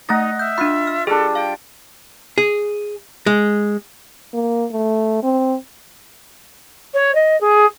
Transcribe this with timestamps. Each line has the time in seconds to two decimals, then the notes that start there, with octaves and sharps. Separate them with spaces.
0.09 A3 D#4 D#5 F#5 A6 A#6
0.39 E5 G6
0.58 D4 F4 B5
0.87 F6
1.07 G3 D4 G#4 A4
1.35 F5 G5
2.38 G#4
3.26 G#3
4.34 A#3
4.72 A3
5.23 C4
6.94 C#5
7.15 D#5
7.40 G#4